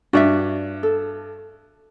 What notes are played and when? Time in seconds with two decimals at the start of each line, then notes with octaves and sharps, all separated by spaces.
0.13 G2 F#4 D5 E5
0.83 A4